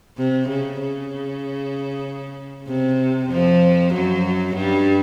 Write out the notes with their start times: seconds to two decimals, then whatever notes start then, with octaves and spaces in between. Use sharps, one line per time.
0.18 C3
0.48 C#3
0.80 C#3
2.68 C3
3.30 F2 F3
3.94 F#2 F#3
4.56 G2 G3